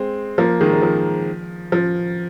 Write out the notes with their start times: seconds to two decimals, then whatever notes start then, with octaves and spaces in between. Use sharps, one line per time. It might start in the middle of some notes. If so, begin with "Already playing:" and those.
Already playing: G#3 C4
0.38 F3 A#3
0.61 D#3 G#3
0.73 G#3
0.82 F3
1.72 F3